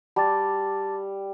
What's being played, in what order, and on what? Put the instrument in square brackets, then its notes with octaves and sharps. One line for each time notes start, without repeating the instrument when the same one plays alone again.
[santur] G3 [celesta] A5 D6 A6